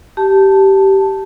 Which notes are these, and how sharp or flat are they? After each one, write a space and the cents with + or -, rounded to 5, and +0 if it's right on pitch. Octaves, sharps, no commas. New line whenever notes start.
G4 -15 A5 +0